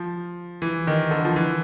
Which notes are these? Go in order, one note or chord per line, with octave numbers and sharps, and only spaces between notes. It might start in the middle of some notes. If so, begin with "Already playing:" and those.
Already playing: F3
E3
D#3
D3
F3
E3